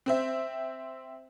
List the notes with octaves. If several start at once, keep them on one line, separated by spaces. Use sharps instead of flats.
C4 C5 E5